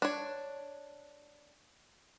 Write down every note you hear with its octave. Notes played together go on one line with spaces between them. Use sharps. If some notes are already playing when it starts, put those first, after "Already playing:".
D4 C#5